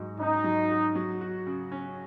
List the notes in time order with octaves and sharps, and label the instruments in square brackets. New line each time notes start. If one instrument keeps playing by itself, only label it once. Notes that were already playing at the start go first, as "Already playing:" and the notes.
Already playing: [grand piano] G#2 F#3 F#4
[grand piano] C#4 [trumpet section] D#4
[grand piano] F#3
F#4
F#3
F#4
C#3
C#4